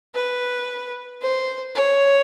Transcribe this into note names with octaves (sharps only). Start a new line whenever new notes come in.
B4
C5
C#5